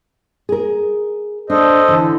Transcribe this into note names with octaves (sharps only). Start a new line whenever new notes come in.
G#4 A#4
D4 A4 C5 D#5
D3 E3